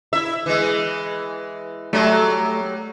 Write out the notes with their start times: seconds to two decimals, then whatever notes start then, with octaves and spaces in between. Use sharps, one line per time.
0.13 E4 E5
0.46 E3 G#3
1.93 F#3 G3 A3